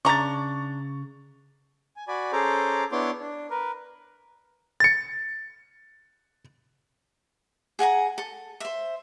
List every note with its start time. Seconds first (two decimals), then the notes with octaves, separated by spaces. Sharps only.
0.05 C#3 D4 A#5 C#6 A6
1.96 G#5
2.08 F#4 D5 G#5 B5
2.32 C#4 G#4 A4 C5 A#5 D6
2.92 B3 D4 E4 C#5 C6 D6
3.21 D4
3.50 A#4 B4
4.80 A6 C#7
7.79 G#4 F#5 G#5 A#5
8.18 A4
8.60 C5 E5